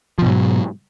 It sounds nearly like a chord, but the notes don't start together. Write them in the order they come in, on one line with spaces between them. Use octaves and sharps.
F3 B2 G#2 F#3